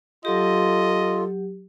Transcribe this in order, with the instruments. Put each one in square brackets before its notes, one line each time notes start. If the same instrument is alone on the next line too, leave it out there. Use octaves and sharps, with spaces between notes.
[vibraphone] F#3 G4 [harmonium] F4 [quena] A4 [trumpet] D#5